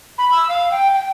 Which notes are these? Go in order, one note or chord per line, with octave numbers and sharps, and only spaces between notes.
B5
E6
F5
G5
G5